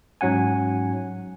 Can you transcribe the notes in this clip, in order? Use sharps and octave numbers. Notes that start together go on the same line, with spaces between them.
G#2 F#3 C#4 F#5 G#5